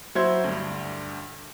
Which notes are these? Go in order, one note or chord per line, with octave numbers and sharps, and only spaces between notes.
F#3 E4 C5 G#6
D2 G2